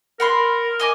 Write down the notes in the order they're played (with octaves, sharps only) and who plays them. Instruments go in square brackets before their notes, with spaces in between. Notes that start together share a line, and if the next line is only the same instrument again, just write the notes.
[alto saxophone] A#4 [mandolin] F#5 B5 C6
[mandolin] D#5 G#5 D6